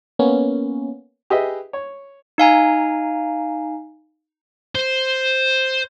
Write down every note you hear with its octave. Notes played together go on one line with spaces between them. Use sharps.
A#3 B3 C#4
G4 G#4 B4 D#5 E5
C#5
D#4 F5 G#5 A#5
C5